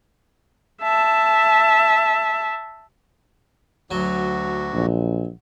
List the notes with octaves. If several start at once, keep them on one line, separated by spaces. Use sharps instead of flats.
E5 A5
D2 F#3 F#4
A#1